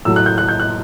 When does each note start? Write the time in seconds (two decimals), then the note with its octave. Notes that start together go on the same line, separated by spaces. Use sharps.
0.05 A2 F#3 A3 E6
0.16 F#6
0.26 G6
0.38 F#6
0.49 G6
0.60 F#6